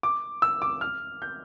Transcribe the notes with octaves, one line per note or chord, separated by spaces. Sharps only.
D6
E6
D6
F6
G6